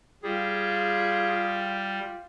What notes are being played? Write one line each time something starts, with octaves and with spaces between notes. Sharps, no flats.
G3 F4 G#4